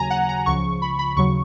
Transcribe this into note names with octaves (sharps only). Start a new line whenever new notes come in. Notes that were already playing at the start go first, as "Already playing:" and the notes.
Already playing: D#2 C#3 F#3 G#5 A#5
F#5
A#5
C#2 C#3 F3 C#6
B5
B5
D#2 C#3 F#3 C#6